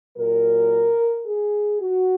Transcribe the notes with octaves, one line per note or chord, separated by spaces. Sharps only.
A#2 F#3 A#4
G#4
F#4